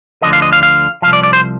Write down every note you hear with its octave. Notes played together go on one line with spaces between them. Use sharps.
D2 D3 F3 D#5
F5
D#5
F5
F5
C2 C3 F3 F5
D5
D5
C5